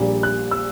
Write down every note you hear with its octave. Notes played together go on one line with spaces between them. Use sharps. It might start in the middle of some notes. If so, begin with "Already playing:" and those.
Already playing: A#1 A#2 G3
F#6
E6